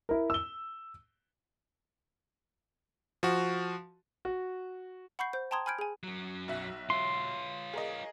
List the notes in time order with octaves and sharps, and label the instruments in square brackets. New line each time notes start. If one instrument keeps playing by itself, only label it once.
[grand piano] E4 A#4
E6 G7
[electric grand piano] F3 F#4
[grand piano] F#4
[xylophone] F#5 B5 C#6 G6 C7
C5 G6
G5 A5 A#5 C6 D#6 G#6
G#5 B5 F6 G6 G#6 D7
G#4 G#5
[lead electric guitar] F#2 F#3
[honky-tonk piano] B1 E5 F#6
[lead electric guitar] F4 C#5 [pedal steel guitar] C6
[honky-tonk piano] G#4 A#4 D#5